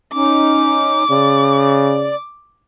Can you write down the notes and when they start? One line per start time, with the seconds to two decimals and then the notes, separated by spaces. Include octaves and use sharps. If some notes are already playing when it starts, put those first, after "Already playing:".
0.14 C#4 D#4 D6
1.10 C#3 D5